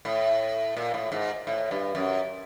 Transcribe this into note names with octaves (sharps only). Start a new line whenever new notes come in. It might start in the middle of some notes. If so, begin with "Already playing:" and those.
A2
A#2
A2
G#2
A2
G2
F#2